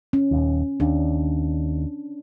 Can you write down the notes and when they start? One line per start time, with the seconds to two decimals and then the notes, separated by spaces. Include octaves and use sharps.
0.13 C#4
0.31 D#1 D#2
0.80 D#2 D4